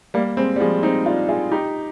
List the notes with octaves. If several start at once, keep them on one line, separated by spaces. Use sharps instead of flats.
G3 A#3
G#3 C4
G3
F3 G#3
C4 D#4
D4 F4
F4 G#4
D#4 G4